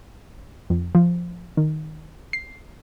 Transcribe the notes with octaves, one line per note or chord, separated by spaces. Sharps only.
F2
F3
D#3
C7